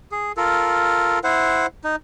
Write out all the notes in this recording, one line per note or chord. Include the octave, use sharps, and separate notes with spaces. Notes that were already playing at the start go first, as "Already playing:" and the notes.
G#4
F4 A4 A#4
E4 C5 F#5
D#4